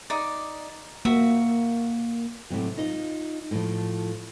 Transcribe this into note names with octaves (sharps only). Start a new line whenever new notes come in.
D#4 D5
A#3 F#4 E5
A2 C3 F#3
D#4 F4 D#5
A2 F3